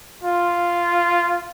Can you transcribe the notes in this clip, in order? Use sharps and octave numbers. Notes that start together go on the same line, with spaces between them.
F4